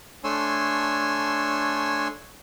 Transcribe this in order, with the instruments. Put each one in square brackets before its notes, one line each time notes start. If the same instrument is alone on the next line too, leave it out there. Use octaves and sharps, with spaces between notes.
[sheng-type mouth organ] A3 D4 C#5 G#5 C6 E6